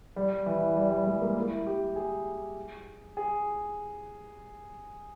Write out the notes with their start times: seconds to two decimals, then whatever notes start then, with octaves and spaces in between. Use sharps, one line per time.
0.16 G3
0.46 E3
0.76 G3
0.91 G3
1.07 G#3
1.21 A#3
1.36 E4
1.67 G4
1.96 G#4
3.17 G#4